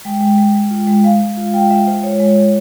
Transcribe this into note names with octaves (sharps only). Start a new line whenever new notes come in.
G#3 G5
G#3
G#3
G#3
F4
G#3
G#3 F5
G#3
F4
F4 G5
G#3 E5
F4 C5
G#3 C#5
G#3
G#3